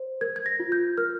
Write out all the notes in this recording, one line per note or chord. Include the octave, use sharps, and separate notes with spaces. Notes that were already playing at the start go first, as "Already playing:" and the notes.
Already playing: C5
A#4 G#6
G#6
A#6
F4
G6
A#4 F6